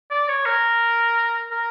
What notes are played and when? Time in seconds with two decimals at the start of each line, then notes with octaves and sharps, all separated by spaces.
0.11 D5
0.28 C#5
0.46 A#4
1.51 A#4